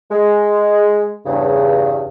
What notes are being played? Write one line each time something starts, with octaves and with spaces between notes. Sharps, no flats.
G#3
E2 G2 C#3